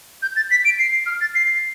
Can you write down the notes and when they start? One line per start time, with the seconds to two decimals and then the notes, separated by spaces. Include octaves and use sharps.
0.22 G6
0.36 A6
0.51 B6
0.65 D7
0.79 C7
1.06 F6
1.21 A6
1.35 C7